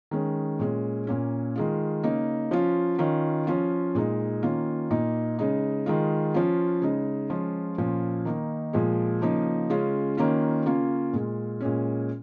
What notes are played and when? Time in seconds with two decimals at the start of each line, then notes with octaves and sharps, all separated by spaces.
0.11 D#3 G#3 C#4
0.59 A#2 G#3 C#4
1.07 A#2 A#3 C#4
1.55 D#3 G#3 F4
2.03 C#3 A#3 D#4
2.51 F3 C#4 F4
2.98 D#3 C#4 F4
3.47 F3 C#4 F4
3.95 A#2 G#3 D#4
4.43 D#3 A#3 C#4 F4
4.90 A#2 A#3 D#4
5.39 C#3 G#3 D#4
5.86 D#3 G#3 F4
6.34 F3 C#4 F4
6.82 C#3 G#3 D#4
7.30 F3 G#3 C#4 F4
7.78 A#2 F3 C#4 F4
8.25 D#3 A#3 D#4
8.73 A#2 F3 G#3
9.21 C#3 F3 A#3 D#4
9.70 C#3 G#3 C#4 F4
10.17 D#3 A#3 C#4 F4
10.65 C#3 A#3 C#4 F4
11.13 A#2 G#3 F4
11.61 A#2 G#3 C#4